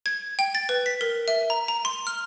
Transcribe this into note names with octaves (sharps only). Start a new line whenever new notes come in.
G#6
G5
A6
B4
B6
A#4
E5
A#5
A#5
C6
F6